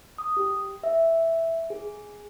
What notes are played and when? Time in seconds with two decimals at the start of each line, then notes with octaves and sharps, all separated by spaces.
0.18 D#6
0.37 G4
0.84 E5
1.70 G#4